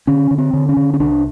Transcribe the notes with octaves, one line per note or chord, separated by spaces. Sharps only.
D3 C#4
D3
C4
D3
C#4
D3
C#4
C2 D4